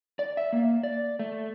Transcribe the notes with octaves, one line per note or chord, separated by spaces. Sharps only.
D5
E5
A#3
D5
A3